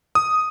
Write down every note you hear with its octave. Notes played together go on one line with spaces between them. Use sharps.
D#6